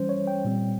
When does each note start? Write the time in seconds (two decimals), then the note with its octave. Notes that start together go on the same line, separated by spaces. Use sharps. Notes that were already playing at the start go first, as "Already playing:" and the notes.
Already playing: E3 G3 C#4 C5
0.09 C#5
0.27 G5
0.45 A#2 G3 C4